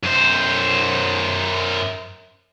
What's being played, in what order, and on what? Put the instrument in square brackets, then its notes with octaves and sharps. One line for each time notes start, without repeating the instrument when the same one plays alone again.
[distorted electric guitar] F#2 C5